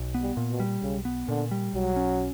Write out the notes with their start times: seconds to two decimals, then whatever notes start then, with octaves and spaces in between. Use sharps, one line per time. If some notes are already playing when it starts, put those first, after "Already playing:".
Already playing: B1
0.14 B3
0.22 G3
0.37 A#2
0.51 B2
0.60 G3
0.82 B1 C#3
1.05 B3
1.28 A#2 D3
1.51 G3
1.74 B1 F#3
1.96 C#4